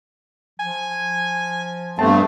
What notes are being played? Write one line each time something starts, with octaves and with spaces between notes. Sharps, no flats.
F3 G#5
G2 A3 B3 C4 A5